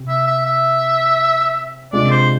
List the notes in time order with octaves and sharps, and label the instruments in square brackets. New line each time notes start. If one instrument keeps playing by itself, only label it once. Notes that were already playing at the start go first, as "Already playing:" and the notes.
Already playing: [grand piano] C3
[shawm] E5
E5
E5
[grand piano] C3 G#3 D4 F4 [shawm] D5
[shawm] C5